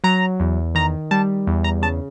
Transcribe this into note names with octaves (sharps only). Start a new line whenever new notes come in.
F#3 A#5
E2
D#3 A#5
G3 A5
E2
A#5
C#3 A5